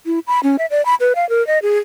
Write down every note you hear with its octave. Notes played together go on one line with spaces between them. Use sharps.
E4
B5
C#4
E5
D5
B5
B4
F5
A#4
D#5
G#4